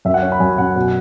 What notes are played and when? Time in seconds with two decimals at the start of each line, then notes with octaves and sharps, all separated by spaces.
0.05 F#2 E5
0.14 F#5
0.22 C#4
0.32 B5
0.40 F#2 G#5
0.58 F#2 F#5
0.76 B2